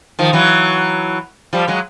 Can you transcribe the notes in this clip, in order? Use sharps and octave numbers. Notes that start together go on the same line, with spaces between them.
D#3 F3
E3 F#3
F3 G3
F#3 G#3